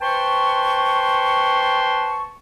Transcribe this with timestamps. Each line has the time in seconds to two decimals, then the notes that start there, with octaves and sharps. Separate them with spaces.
0.01 B4 C5 G5 A5 C6 C#6